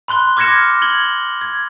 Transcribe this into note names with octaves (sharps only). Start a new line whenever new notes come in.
B5 C6 F#6 G7
D6 F6 G#6 A#6 C#7 E7
G#6 F#7 G7
G#6